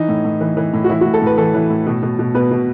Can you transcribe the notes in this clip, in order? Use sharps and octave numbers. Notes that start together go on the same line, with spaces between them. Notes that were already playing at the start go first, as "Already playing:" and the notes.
Already playing: E3 D#4
A2
A2
E3
E3
A2
F#4
E3 E4
A2 F#4
A4
A2 B4
E3 A4
E3
A2
B2
B2
B2
B2 B4
B2